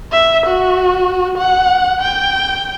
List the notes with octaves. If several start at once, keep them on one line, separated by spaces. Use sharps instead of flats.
E5
F#4
F#5
G5